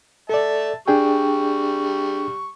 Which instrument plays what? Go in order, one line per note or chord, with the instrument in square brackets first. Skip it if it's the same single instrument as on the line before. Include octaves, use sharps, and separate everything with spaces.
[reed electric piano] A4 D5 [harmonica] E5 A5
[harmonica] G3 C#6 [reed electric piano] D4 G#4 G5